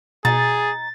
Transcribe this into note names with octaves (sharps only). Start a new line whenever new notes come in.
B2 D#4 G#4 A6